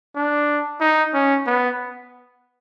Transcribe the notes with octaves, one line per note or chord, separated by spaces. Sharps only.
D4
D#4
C#4
B3